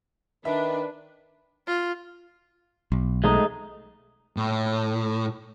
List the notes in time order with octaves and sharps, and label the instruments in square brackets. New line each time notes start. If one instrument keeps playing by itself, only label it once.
[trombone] D#3 [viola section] D4 [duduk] B4 [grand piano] E5
[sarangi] F4
[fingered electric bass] B1
[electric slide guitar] G#3 A3 D#4
[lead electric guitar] A2